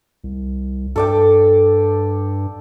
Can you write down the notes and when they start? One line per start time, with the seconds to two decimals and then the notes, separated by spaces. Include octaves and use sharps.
0.24 C2
0.96 G2 A4 D5 G5